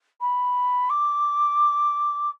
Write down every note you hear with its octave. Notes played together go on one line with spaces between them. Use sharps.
B5
D6